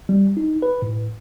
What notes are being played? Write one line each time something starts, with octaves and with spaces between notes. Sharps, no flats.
G3
D#4
B4
A2